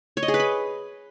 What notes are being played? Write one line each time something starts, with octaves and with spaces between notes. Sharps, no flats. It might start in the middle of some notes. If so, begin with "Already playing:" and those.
C#5
D#5
G#4
B4
B5